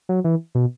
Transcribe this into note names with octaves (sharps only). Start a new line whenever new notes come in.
F#3
E3
B2